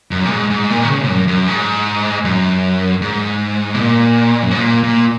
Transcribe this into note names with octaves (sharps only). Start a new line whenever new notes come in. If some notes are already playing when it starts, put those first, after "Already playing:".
F#2
A#2
G#2
G#2
A#2
D#3
C#3
F#2
F#2
G#2
F#2
G#2
B2
A#2
F#2
G#2
A#2
A#2